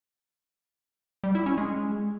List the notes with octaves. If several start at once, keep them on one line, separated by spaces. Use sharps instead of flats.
G3
E4
C#4
G#3